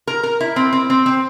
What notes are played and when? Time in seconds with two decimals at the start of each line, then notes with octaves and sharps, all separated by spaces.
0.07 A#4
0.23 A#4
0.41 E4
0.56 C4
0.73 C4
0.90 C4
1.06 C4